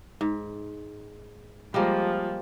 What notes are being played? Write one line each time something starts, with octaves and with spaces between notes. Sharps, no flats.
G#2
F3 G3 G#3 A#3 F4